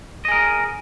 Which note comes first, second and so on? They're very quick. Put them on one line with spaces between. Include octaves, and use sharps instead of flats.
D#5 G#4 A#4